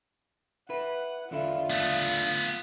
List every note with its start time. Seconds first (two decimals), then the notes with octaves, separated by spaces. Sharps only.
0.69 E4 B4 F#5
1.31 E2 D3 E4 F4
1.70 A3 B3